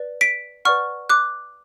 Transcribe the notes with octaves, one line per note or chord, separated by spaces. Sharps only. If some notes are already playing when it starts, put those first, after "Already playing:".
Already playing: B4 D5
B6 D7
B4 D5 F#5 C#6 F6
D6 F#6